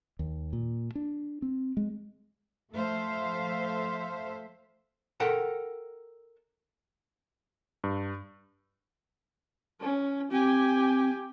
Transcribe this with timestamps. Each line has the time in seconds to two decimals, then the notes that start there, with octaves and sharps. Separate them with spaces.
0.19 D#2
0.53 A#2
0.95 D4
1.42 C4
1.77 G#3
2.72 F3 A3 A4 C5 E5 F5
5.20 A4 A#4 F#5 G5
7.84 G2
9.80 C#4
10.31 C4 G4 G#5